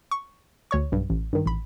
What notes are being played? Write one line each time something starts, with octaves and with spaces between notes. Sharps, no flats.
C#6
D2 C#5 C#6
B1 G2
A1
G2 D#3
A1 B5